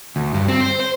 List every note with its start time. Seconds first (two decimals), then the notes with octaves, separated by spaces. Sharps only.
0.16 D2
0.34 G2
0.48 C4
0.61 C5
0.80 C5